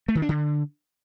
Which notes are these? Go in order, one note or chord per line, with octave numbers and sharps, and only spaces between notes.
A3
D#3
D4
D3